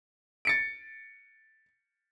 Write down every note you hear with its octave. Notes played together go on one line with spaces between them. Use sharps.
A6 C#7 D7